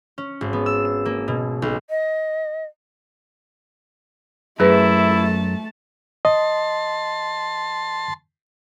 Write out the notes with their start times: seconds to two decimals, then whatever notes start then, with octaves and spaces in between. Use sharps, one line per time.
0.18 C#4
0.41 G#1
0.53 B3
0.66 E6
0.85 E7
1.06 A#3
1.28 B2
1.62 B1
1.90 D#5
4.60 F#2 A3 E4 G#4 B4 A5
6.25 D#5 A5 C6